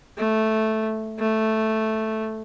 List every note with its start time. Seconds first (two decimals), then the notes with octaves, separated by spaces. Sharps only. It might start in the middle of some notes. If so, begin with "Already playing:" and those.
0.18 A3
1.19 A3